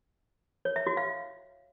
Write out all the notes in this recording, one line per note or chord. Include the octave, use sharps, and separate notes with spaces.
C#5
E5
F#4
F5